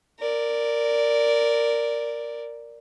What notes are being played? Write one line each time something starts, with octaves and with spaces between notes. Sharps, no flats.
A#4 D5